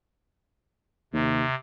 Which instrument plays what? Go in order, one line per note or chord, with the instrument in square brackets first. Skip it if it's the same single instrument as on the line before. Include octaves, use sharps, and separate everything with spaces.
[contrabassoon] D#2 [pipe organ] C3